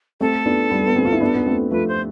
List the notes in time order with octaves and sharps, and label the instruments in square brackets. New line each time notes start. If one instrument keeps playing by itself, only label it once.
[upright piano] A3 C4 [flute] A4
[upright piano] B3 D4
G3 B3
B3
A3 C4
F4
E4
B3 D4
B3
A3 C4
[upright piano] F3 A3 [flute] B4
[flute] C5